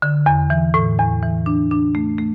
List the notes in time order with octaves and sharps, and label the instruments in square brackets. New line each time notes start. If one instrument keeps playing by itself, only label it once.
[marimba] D3
E2
E3
A2
E2
E3
D4
D4
A3
A3